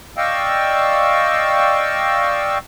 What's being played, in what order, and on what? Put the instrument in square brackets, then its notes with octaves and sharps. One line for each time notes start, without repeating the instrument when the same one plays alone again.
[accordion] D5 D#5 F5 G5 C#6 E6